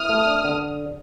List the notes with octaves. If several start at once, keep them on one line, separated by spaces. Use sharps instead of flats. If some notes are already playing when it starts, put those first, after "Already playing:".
Already playing: E4 D#6 F6
A3
D4
D3